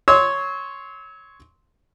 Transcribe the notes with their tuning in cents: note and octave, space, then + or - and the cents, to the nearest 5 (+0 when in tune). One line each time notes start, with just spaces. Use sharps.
C#5 +0 C6 +0 E6 -35